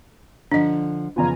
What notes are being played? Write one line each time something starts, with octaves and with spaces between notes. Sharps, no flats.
D3 F3 D4 D#5
F2 C#3 B3 F4 G#5 A#5